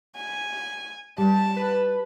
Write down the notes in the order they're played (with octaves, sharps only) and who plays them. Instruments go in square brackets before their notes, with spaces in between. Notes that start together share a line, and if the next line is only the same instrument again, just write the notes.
[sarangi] G#5
[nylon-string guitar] G3 [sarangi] A5
[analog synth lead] B4